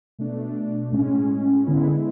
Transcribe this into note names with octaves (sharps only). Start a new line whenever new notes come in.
B2 A3 D4
A2 G#3 C#4
D3 G#3 B3 E4